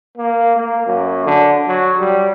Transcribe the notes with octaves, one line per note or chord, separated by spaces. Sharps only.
A#3
A#3
F#2
D3
F#3
G3